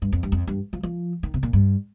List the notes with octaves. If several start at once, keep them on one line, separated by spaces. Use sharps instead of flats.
G2
F2
G2
F2
G2
F3
F3
D#3
C3
A#2
G2